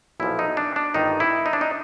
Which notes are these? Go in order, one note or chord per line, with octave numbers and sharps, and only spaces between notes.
B1 A#2 F3 E4
D#4
D4
D4
G1 G2 D#3 D#4
E4
D#4
D4
D#4